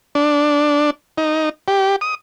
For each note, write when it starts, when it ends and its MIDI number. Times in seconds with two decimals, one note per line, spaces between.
0.15 0.90 62
1.18 1.49 63
1.68 1.96 67
2.01 2.15 87